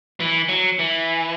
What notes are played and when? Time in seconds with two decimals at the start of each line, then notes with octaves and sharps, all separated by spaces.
0.20 E3
0.49 F#3
0.79 E3